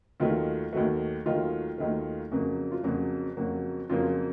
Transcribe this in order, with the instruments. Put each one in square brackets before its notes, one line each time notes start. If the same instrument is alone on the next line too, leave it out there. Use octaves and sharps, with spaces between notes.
[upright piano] D#2 D#3 F#3 A3 F4
D#2 D#3 F#3 A3 F#4
D#2 D#3 F#3 A3 F4
D#2 D#3 F#3 A3
F2 C#3 F#3 A#3 F#4
F4
F2 C#3 F#3 A#3 F#4
F2 C#3 F#3 A#3 F#4
F2 C#3 F#3 A#3 F4